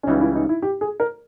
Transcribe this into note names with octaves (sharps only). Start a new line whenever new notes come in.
C#4
C#2 C#3 E3 G3 D#4
E4
D#4
E4
G4
G#4
A#4